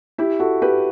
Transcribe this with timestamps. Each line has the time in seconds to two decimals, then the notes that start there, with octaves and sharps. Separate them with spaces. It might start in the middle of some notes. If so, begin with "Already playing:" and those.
0.18 E4 G4
0.39 F#4 A4
0.62 G4 B4